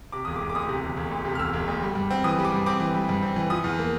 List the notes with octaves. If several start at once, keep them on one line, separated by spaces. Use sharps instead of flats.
C3 D6
E1 D#6
D6
E1
D6
D2 D#6
C3
E1
E1
D2
C3
F6
E1 E6
E1
D2
G3
G2
C4
E3 D#6
G3
D6
G2
C4 D6
E3
G3
G2
C4
E3
F3 D#6
E2
A#3